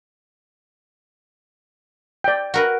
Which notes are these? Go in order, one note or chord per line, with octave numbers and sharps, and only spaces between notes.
D5 G5
F#4 A#4 B4